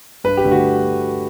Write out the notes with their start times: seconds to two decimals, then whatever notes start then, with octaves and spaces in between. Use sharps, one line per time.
0.24 G2 B4
0.37 G4
0.45 D3 A3 D4
0.51 F#4